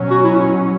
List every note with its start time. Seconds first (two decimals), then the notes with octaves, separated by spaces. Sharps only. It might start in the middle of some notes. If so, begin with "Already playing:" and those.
Already playing: B2 F#3 C#4
0.10 F#4
0.24 E4